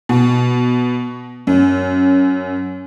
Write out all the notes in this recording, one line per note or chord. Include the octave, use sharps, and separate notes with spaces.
B2
F#2